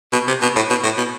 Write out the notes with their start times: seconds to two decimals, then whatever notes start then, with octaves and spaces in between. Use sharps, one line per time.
0.13 B2
0.28 C3
0.42 B2
0.56 A2
0.70 B2
0.84 A2
0.97 B2